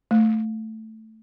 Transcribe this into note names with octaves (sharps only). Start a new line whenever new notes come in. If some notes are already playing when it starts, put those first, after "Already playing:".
A3